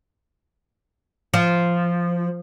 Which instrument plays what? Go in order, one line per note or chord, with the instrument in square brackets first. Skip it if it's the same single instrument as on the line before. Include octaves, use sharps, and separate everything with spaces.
[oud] F3